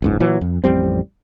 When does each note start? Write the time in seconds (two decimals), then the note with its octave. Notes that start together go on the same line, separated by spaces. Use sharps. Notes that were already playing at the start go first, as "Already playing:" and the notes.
0.02 F#1 C#2 G#2
0.20 A#2 E3 F#3
0.41 F2
0.64 A1 F2 G3 C4